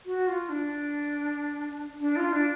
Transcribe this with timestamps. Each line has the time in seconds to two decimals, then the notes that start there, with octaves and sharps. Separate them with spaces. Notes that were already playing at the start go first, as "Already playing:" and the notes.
0.06 F#4
0.28 F4
0.49 D4
2.01 D4
2.16 F4
2.33 D4